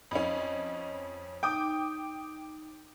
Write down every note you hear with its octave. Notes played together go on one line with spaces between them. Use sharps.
F2 C#4 D#5 B5
D#4 G5 D6 D#6 G6